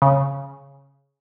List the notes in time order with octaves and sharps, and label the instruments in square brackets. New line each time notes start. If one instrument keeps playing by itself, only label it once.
[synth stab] C#3